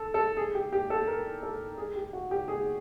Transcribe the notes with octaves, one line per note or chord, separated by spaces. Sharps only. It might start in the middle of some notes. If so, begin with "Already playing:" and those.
Already playing: A4
A4
G#4
G4
G4
A4
A#4
A4
G#4
G4
F#4
G4
G#4